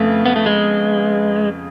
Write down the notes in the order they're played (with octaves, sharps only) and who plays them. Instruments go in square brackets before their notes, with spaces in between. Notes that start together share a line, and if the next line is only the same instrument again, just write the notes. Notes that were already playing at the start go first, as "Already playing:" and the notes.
Already playing: [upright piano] F2 C#3 B3 [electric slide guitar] A3
[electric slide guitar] B3
A3
G#3